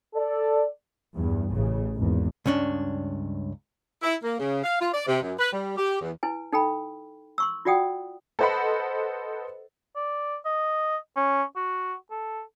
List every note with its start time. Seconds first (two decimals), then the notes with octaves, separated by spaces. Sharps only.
0.15 A4 D5
1.13 E2 G2
1.54 A1 C#3
1.96 G#1 E2
2.46 C#2 G2 C#4 D4
4.02 E4
4.23 A#3
4.39 C#3
4.64 F5
4.80 F4
4.93 D5
5.07 C3
5.22 F#2
5.39 B4
5.53 G3
5.77 G4
6.01 E2
6.23 E4 B4 G#5
6.53 D#4 A4 G5 B5
7.38 C6 C#6 E6
7.65 F4 F#4 D5 F#5 G5 D#6
8.39 A4 B4 C5 D#5 F#5 B5
9.96 D5
10.45 D#5
11.16 C#4
11.56 F#4
12.11 A4